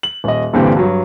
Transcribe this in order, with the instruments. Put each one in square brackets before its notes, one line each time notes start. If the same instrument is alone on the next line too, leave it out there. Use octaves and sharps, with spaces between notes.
[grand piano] F#7
D#1 D#5
G2 A#2 D3 E3 C4 G4
G2 F#3